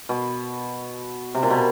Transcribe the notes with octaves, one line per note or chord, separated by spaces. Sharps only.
B2
C3
A#2
B2